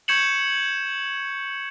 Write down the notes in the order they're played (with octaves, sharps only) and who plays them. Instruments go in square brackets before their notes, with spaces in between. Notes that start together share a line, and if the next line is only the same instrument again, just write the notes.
[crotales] C#6 G6 G#6 C#7 E7 F#7